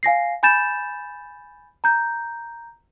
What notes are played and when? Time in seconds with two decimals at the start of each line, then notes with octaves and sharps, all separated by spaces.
0.03 F5 G#5 A#6 C7
0.43 G#5 B5 G6 A6 E7
1.84 A#5 G6